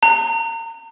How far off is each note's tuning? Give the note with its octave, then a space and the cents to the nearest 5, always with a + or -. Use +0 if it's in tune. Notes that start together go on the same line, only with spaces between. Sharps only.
A#5 -35